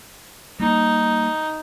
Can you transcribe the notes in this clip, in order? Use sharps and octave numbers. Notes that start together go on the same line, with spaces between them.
G3 A#3 D#4